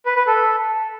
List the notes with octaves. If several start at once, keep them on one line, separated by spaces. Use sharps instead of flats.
B4
B4
A4